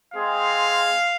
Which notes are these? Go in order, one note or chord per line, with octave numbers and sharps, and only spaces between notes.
G#3 C4 G#4 F5